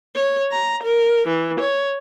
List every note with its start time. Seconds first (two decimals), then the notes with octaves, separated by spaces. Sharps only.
0.15 C#5
0.52 A#5
0.83 A#4
1.27 E3
1.60 C#5